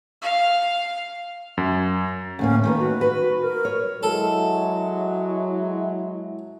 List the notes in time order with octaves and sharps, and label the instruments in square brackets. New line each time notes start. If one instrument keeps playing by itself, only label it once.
[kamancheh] F5
[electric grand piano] F#2
[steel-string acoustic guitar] D2 A2 A#3 [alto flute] C#4
[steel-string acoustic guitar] D#3 A3 B4 [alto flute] A#3
[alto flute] F#4
[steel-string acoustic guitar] B4
[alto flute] A#4
[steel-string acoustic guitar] C#5
[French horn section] F#3 G#3 [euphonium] E4 [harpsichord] A4